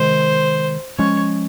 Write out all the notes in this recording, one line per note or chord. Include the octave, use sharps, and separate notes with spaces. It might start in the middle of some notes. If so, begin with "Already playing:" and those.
Already playing: C3 D#3 G#3 C5
F3 G#3 C#4 C#5